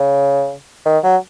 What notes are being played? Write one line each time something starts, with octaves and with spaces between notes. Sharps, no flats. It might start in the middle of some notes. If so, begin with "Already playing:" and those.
Already playing: C#3
D#3
F#3